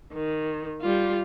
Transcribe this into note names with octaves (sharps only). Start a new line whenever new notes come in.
D#3
G3 F4